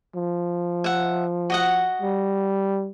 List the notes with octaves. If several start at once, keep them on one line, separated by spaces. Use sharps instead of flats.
F3
E5 F#5
F#4 D#5 F#5
G3